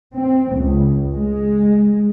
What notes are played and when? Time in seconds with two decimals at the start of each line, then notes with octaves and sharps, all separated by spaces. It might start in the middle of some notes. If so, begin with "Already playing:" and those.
0.14 C4
0.55 C#2
1.13 G#3